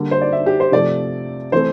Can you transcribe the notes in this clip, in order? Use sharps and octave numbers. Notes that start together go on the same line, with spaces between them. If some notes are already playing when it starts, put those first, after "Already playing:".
Already playing: D3 G3 A#3
C5
D5
E5
G4
C5
C3 F3 A3 D5
E3 A3 C4 C5